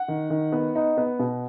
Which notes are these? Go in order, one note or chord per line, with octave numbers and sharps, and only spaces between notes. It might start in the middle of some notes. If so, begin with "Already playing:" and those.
Already playing: F#5
D#3
D#3
B3
D#4
B3
B2